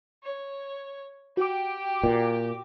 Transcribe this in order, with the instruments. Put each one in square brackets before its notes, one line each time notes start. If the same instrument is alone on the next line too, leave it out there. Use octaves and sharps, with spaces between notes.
[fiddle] C#5
[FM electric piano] F#4 D6 [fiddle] G4 G5
[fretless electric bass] A#2